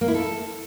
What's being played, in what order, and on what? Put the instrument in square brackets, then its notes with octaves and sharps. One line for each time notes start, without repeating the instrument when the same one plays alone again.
[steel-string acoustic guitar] A#3
E4
A4